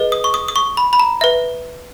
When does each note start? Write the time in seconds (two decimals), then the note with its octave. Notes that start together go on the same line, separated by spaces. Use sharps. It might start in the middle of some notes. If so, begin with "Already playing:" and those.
Already playing: G#4 B4 D#5
0.12 D#6
0.24 C#6
0.34 D#6
0.48 D#6
0.56 C#6
0.77 B5
0.93 B5
0.99 A#5
1.21 B4 E5